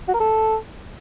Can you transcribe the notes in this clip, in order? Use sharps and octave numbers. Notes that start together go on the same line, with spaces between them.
F#4
A#4
A4